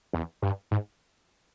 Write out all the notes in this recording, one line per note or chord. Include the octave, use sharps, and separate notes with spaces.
E2
G2
G#2